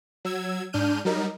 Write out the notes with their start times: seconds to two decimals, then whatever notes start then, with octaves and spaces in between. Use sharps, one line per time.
0.25 F#3 E6 G#6
0.73 G#2 D4 F6 G6 D#7
1.05 F#3 G3 D#4 A#4